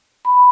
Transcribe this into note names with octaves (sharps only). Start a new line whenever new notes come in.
B5